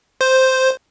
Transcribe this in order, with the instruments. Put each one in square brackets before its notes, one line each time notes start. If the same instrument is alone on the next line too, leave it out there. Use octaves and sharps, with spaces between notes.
[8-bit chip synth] C5